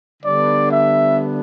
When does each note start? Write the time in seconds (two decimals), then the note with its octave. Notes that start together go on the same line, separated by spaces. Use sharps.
0.23 D3 G3 B3 D4 D5
0.70 E5